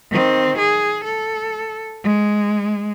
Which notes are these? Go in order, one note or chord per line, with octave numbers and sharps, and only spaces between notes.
D#3 C4
G#4
A4
G#3